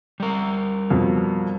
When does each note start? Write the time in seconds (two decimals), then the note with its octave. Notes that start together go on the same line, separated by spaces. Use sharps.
0.20 G3 A#4
0.90 F2 B2